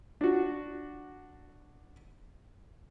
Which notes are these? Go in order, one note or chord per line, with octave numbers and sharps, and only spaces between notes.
D4 F#4